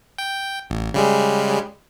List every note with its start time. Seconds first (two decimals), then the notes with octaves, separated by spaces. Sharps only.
0.18 G5
0.70 A1
0.94 C#3 G3 G#3